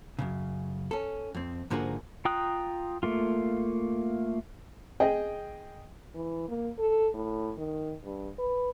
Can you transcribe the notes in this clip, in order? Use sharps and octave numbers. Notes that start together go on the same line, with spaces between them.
F#2 A#2 C#3
C#4 A4
F2 C4
G#2 D3 F3 A#3 F#4 G#4
F4 G5 A#5 D#6 F#6
A3 A#3 F4
G#4 D#5 G5
E3
A#3
A4
A2
D#3
G2
B4